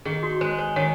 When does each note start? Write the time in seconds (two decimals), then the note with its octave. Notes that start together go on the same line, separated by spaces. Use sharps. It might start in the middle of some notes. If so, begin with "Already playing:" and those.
0.05 D#3 G#4
0.23 F#4
0.41 G#3 C5
0.59 C5
0.76 D#3 C#5